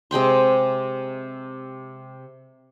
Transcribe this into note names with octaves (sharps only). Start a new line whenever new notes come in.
C3 G#3 G5 C6